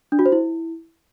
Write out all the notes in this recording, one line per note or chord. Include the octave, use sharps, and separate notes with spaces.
D4
F#4
C5
E4